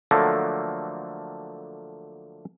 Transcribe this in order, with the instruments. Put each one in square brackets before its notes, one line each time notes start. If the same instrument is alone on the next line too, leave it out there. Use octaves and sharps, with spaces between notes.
[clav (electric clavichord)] D3 F3 F#3 A3 A#3 D4